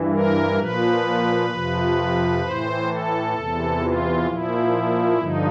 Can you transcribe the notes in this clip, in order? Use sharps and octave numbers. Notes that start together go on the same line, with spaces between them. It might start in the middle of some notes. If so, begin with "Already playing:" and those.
Already playing: G2 E3
A#4
A#2 F3 B4
F2 C3 F3
A2 E3 C5
A4
E2 C3 E3
F4
A#2 F3 E4
G2 D3 F3 D#4